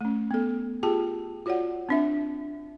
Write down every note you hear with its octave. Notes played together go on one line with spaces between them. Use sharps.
A3 C#4
B3 A4
F4 G4 G#4 G5 A5
F4 F#4 C#5 D5 F#5
C4 D4 E5